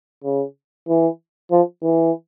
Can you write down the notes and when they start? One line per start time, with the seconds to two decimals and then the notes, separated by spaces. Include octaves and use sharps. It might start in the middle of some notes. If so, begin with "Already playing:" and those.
0.24 C#3
0.88 E3
1.51 F3
1.83 E3